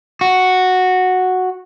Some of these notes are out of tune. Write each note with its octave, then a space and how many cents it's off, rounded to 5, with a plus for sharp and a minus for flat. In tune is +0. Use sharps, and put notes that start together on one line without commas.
F#4 -5